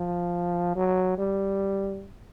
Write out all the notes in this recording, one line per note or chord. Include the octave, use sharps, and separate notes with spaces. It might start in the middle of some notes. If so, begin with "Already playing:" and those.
Already playing: F3
F#3
G3